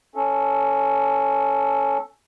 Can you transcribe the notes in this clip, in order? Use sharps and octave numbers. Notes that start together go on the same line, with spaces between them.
C#4 A4